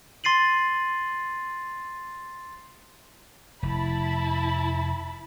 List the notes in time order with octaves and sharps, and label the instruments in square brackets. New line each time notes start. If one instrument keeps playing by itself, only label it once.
[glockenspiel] C6 A6 C7 D#7 F#7
[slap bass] F1 [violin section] E4 A5 B5